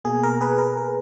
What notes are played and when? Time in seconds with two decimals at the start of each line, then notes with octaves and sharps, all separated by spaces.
0.04 B2 A#3 G#4
0.23 A#4
0.41 G#4 B4
0.58 A#4
0.77 A#4